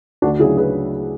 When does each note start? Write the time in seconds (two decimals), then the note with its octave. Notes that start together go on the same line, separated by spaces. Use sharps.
0.22 D2 D4 F#4
0.39 C#3 E4 G#4
0.44 F#3
0.57 G#4 B4